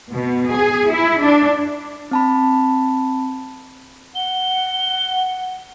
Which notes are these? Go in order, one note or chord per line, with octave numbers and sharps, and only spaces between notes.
B2
G#4
E4
D4
C4 A5 B5
F#5 G7